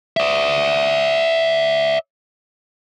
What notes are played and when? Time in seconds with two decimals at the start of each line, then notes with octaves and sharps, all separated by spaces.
0.17 D5 E5